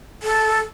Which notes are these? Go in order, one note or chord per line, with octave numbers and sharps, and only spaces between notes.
A4